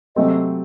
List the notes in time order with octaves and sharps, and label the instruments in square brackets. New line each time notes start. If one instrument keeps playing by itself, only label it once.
[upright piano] C3 F#3 A3 C4 [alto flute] D#5